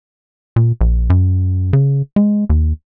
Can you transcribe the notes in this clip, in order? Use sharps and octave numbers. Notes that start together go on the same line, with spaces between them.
A#2
A#1
F#2
C#3
G#3
D#2